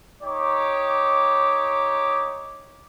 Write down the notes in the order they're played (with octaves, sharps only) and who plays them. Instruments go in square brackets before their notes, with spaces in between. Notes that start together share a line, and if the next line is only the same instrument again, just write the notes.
[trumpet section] D#4 G4 C#5 D6